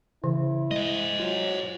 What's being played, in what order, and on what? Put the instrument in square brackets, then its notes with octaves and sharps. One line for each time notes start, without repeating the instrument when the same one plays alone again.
[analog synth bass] C#3 [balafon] E3 [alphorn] E4
[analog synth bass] G#3 [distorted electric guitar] C5 D#5
[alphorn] F#3 [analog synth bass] F4